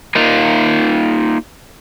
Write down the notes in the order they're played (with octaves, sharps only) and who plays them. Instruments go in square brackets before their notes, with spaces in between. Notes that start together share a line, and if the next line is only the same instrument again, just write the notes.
[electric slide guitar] A#3 D#4 F4